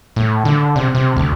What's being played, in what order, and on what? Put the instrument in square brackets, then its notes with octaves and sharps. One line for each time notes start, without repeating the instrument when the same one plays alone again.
[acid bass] A2
D3
C3
C3
D2